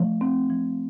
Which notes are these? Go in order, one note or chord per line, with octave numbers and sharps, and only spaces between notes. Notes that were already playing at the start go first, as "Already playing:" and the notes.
Already playing: F3 A3
C4
F3